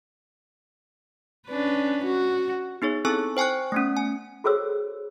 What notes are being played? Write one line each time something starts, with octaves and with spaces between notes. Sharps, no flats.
C#4 D4 B4
F#4
B3 D#4 G#4 C#5
C4 E4 A4 G#5 C#6 E6
C5 G5 G#5 C#6 F#6
A3 B3 C#4
G#5
F#4 G#4 A4 C5 C#5 E6